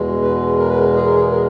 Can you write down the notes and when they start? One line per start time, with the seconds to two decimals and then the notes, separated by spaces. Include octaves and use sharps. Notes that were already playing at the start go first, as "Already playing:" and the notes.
Already playing: E2 B2 G#3
0.22 B4
0.58 A#4
0.69 B4
0.79 A#4
0.95 G#4
1.05 A#4
1.16 G#4
1.31 A#4